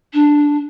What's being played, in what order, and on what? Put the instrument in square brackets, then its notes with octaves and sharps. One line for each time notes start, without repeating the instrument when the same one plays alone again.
[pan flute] D4